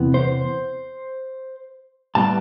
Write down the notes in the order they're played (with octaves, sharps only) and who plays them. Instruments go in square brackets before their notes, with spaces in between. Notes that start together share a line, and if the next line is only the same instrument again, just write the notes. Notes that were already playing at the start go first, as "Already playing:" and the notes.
Already playing: [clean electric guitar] E2 C3 E3 B3
C5
A2 G3 B3 A5